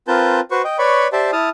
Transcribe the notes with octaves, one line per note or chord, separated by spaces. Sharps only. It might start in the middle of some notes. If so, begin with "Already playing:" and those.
C4 F4 A#4 B4 A5 G6
F#4 B4 C5 C#6
D#5 G5
B4 C#5 D5 B5 C#6
G4 C5 D5 E5 G5 A5
E4 A5 D#6 F6